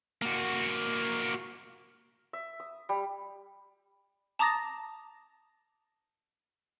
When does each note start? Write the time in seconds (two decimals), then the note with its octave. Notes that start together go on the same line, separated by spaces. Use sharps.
0.22 A#3 F#4
2.33 E5
2.60 D#6
2.89 G3
4.39 A5 A#5 D6 D#6 A6 A#6